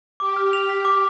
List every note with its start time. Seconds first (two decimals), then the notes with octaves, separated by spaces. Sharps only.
0.20 G4 D6
0.36 F6
0.53 G4 F7
0.69 B6
0.85 D6